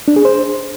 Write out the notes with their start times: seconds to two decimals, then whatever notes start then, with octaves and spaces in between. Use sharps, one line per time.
0.08 D4
0.16 G#4
0.25 C5